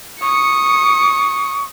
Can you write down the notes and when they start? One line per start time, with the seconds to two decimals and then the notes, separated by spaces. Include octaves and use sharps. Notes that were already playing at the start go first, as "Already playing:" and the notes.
0.22 C#6 D#6 C#7